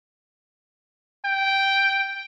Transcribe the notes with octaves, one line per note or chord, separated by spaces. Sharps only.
G5